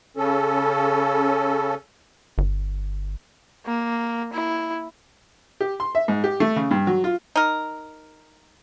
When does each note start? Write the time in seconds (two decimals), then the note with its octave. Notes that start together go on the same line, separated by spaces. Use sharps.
0.17 C#3 C#4 A4
2.38 G1
3.66 A#3
4.34 E4
5.60 G4
5.80 C6
5.95 E5
6.08 G#2
6.24 G4
6.40 A3
6.56 C#3
6.71 G2
6.87 F#3
7.04 F4
7.36 D#4 A#4